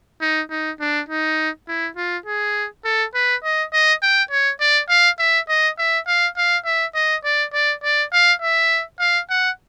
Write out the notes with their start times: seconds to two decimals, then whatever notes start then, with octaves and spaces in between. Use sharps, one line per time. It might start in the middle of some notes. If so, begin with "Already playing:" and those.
0.21 D#4
0.51 D#4
0.80 D4
1.09 D#4
1.68 E4
1.97 F4
2.26 G#4
2.85 A4
3.15 B4
3.44 D#5
3.73 D#5
4.03 G5
4.31 C#5
4.61 D5
4.90 F5
5.19 E5
5.49 D#5
5.78 E5
6.07 F5
6.37 F5
6.65 E5
6.95 D#5
7.24 D5
7.54 D5
7.84 D5
8.13 F5
8.42 E5
9.00 F5
9.30 F#5